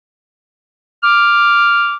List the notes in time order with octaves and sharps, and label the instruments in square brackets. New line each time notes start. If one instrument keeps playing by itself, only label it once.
[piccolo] D6 [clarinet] F6